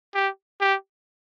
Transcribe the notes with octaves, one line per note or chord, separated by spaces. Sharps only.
G4
G4